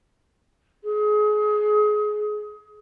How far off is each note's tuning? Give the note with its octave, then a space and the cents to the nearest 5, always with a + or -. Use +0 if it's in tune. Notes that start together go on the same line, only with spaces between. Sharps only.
G#4 +25